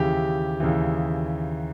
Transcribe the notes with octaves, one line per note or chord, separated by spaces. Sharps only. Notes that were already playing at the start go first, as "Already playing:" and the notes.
Already playing: D#2 C#3 E3 G4
D#2 C#3 E3